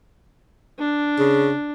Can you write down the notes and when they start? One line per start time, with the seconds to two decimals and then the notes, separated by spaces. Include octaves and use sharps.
0.79 D4
1.19 C#3